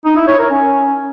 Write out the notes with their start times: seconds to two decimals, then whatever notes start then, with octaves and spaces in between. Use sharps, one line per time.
0.05 D#4
0.17 E4
0.28 C#5
0.39 A#4
0.50 C#4